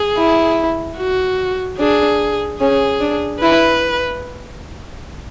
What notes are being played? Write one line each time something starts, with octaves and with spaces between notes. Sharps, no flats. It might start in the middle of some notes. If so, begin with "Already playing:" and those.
Already playing: G#4
E4
F#4
D4 G#4
C#4 G#4
D4
E4 B4